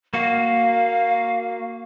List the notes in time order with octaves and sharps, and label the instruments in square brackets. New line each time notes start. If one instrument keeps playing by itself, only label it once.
[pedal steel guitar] A#3 F#4 [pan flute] F5